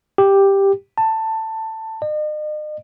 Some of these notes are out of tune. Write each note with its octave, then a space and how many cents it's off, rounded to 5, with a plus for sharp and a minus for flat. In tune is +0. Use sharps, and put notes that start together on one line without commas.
G4 +5
A5 +15
D#5 -40